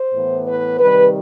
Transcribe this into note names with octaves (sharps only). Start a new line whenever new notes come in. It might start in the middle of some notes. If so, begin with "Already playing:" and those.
Already playing: C5
A2 E3 B3
B4
C3 D#3 G3 B4